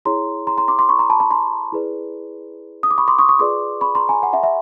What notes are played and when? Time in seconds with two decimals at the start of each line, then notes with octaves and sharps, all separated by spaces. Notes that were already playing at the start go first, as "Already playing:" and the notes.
0.05 E4 G#4 C#5 A#5 C6
0.47 A#5 C6
0.57 A#5 C6
0.68 C6 D6
0.79 C6 D6
0.89 B5 C#6
0.99 A#5 C6
1.10 A5 B5
1.20 A5 B5
1.31 A#5 C6
1.72 E4 G#4 B4 D5
2.83 D#6
2.91 D6
2.98 B5 C#6
3.08 C6 D6
3.19 C#6 D#6
3.29 C#6 D#6
3.39 F4 G#4 B4 D5 C6 D6
3.81 B5 C#6
3.95 A#5 C6
4.09 G#5 A#5
4.23 F#5 G#5
4.33 E5 F#5
4.43 E5 F#5